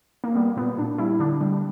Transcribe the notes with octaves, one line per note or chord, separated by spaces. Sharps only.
A#3
G3 B3
A#2 B3
A#2 D4
G3 E4
D3 D4
G3